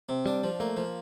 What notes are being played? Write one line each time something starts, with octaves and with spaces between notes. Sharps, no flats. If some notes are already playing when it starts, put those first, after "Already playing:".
C3
G3 D4
F3
A3 A#3
F3